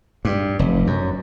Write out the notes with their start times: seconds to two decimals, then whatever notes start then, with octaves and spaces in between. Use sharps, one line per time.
0.25 G2
0.59 F1
0.87 F#2